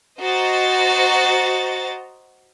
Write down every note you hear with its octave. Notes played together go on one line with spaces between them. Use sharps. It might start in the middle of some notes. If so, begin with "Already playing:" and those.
F#4 C5 D#5 A#5 A6